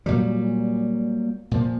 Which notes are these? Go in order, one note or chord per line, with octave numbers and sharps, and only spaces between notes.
A#2 F#3 G3
A#2 F3